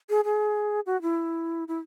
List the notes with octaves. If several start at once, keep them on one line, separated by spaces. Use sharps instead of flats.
G#4
G#4
F#4
E4
E4